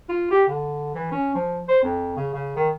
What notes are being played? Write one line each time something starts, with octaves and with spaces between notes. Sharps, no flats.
F4
G4
D3
E3
C#4
F3
C5
F2
C#3
C#3
D#3